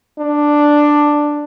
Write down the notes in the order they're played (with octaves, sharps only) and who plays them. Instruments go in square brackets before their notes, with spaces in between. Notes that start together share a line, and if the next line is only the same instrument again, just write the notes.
[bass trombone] D4